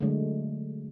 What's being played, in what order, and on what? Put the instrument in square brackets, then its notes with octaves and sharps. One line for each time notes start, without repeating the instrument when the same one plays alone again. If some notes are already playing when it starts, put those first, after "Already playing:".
[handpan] D3 F#3 G#3 A3